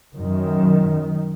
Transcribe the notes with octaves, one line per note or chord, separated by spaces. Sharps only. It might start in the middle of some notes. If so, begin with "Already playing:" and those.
F#2 D#3